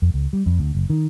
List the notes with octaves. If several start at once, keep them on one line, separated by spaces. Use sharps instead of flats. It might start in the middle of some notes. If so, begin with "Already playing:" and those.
F2
C#2
G3
F2
D2
F#1
D#3